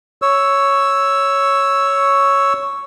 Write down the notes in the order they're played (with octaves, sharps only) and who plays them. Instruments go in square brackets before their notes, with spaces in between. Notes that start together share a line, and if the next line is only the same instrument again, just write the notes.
[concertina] C#5 E6